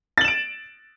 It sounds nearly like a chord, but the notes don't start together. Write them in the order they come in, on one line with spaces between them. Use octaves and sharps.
A6 F#7 E7 D7